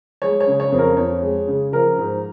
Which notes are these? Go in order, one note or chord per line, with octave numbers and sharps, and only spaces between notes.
G#3 C#5
C#5
C#3
C#5
F2
A#4
F2 C#5
G#3
C#3
F3 A#4
G#2